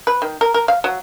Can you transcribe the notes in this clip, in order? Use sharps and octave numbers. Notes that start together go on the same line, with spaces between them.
B4
D#3
A#4
A#4
F5
F#3